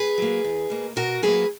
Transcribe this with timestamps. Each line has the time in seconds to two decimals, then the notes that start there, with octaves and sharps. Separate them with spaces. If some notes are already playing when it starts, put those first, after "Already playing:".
Already playing: G#4 B4
0.18 F#3 A#3
0.44 E2
0.70 B2 A#3
0.96 B2 F#4 A#4
1.22 F#3 A#3 G#4 B4